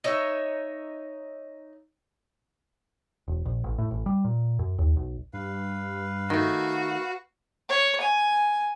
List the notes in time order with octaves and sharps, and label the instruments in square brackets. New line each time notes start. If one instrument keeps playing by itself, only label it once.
[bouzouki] D#4 C#5 E5
[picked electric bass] E1
A#1
A1
A2
A1
G3
A#2
F#2
D#2
B1
[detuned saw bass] G2 [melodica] B4 F5
[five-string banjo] D#3 A3 [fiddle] F#4
[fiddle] C#5
G#5